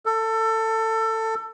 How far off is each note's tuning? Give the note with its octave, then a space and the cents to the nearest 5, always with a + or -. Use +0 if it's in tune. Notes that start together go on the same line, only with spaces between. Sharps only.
A4 +20